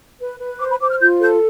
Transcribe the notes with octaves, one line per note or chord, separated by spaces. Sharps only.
B4
B4
C5 D6
B5
C5 D6
F6
F4 G6
A4 G6